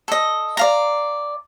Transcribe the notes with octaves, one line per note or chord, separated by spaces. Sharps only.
A4 D#5
D5 F5 A#5